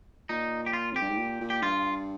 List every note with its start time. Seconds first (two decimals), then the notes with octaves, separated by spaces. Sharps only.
0.29 A#2 D#4
0.66 G4
0.73 F4
0.93 F2 G4
1.01 G2
1.10 G#2
1.18 A#2
1.40 A#2
1.50 G4
1.62 G2 F4